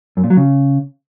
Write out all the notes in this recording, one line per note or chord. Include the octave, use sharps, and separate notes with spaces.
F#2
A#2
F#3
C#3